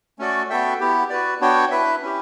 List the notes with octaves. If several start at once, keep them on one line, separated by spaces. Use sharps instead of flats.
A3 C#4 F#4 A4 D5
B3 F#4 A4 E5 G5
B3 E4 G4
F#4 B4 D5
B3 D4 F#4 C#5 G5
E4 B4 E5
C#4 E4 G4